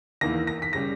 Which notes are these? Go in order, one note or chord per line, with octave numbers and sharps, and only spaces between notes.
E2 D#3 A#3 E4 A#6
A#6
B6
C#3 G3 A#6